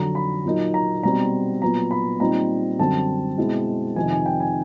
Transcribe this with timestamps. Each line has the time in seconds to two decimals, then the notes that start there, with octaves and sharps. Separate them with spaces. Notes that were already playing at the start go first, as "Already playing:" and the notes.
Already playing: F2 D3 F#3 A#5
0.15 B5
0.45 A#2 F#3 A#3 D#4
0.74 A#5
1.03 B2 G3 C4 A#5
1.62 A#2 F#3 B3 A#5
1.91 B5
2.20 A#2 G3 C4 D#4 A#5
2.79 F#2 D3 G3 C4 A5
3.37 B2 G#3 C4 E4
3.96 F2 C3 D#3 G#5
4.11 G#5
4.26 G5
4.40 G#5